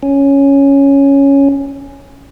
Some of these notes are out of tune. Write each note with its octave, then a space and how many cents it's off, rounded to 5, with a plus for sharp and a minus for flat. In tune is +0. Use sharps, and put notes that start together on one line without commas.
C#4 +0